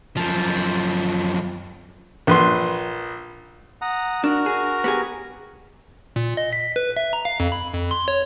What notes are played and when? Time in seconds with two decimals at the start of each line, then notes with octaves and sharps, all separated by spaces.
0.17 F#2 F3
2.27 A#1 B4 C6
3.82 F#5 A#5 D#6
4.24 D4 F#4 A#4 A#5
4.46 G#4
4.84 B3 G4 G#4
6.16 A#2
6.37 D#5
6.53 B6
6.76 B4
6.97 E5
7.13 A#5
7.25 F5
7.40 F2
7.52 B5
7.74 F2
7.91 C6
8.08 C#5